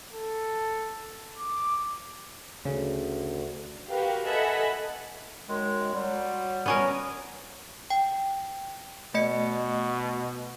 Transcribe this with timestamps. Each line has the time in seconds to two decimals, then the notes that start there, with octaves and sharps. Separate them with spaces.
0.14 A4
1.38 D6
2.65 D2 C#3
3.88 F#4 G4 A#4 B4 F5
4.26 A4 D#5 E5 F#5 G#5 B5
5.49 F#2 D#3 G#3
5.94 F#3 G3
6.66 B3 C#4 A#4
7.90 G5
9.14 B2 A3 D#5 C#7